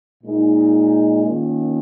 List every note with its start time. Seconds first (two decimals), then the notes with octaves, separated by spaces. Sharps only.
0.23 A#2 G#3 D#4
1.25 D#3 A#3 C#4 F4